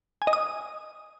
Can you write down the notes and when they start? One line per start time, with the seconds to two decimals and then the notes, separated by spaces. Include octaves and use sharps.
0.22 G#5
0.27 D#5
0.33 D#6